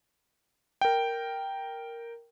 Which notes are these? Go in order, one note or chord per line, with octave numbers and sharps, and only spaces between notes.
A#4 G5